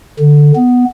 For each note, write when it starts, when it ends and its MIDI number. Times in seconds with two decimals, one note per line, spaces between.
0.19 0.52 50
0.55 0.85 59